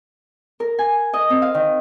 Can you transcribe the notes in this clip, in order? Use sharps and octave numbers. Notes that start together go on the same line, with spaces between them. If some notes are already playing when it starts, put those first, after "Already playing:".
A#4
G#5
D#5
C4
F5
D#3